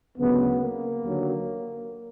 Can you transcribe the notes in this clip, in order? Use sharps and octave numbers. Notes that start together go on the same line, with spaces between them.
D2 C#3 F#3 B3
A#3
D#2 D3 F#3